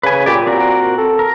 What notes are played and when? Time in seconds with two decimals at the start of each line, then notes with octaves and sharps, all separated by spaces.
0.03 C#3 B4 G#5
0.26 A#2 G4 D5
0.47 C4 F#4 A#4
0.98 A4
1.19 A#4